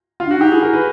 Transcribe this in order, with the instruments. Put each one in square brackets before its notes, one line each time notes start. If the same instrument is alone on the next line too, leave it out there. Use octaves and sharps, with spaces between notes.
[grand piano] F4
[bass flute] D4 [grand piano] F#4
[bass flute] D#4 [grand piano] G4
[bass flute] E4 [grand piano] G#4
[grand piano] A#4
B4